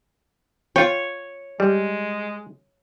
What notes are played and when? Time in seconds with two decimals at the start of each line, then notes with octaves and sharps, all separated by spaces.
0.76 F4 C#5 G5
1.60 G3 G#3